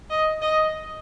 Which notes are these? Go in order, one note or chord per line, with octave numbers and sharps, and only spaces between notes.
D#5
D#5